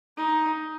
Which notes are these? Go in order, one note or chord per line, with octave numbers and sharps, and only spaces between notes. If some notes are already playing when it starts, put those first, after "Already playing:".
D#4